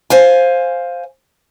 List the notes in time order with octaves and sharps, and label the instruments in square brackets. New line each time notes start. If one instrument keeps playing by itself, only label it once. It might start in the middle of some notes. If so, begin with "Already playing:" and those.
[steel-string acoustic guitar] C5 F5 G#5